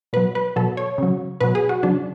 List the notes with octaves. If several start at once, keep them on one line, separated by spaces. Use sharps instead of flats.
B2 F#3 B4
B4
B2 F#3 A4
C#5
C#3 F#3
B2 F#3 B4
G#4
F#4
C#3 F#3 D4